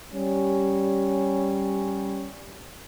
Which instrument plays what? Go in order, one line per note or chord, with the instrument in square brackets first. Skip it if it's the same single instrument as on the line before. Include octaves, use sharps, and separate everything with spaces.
[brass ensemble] G3 C#4